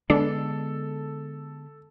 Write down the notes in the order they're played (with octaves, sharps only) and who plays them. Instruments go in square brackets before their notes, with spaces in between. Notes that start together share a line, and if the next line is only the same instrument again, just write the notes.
[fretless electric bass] D3 G#3 B3 [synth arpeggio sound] D4 [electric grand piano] A4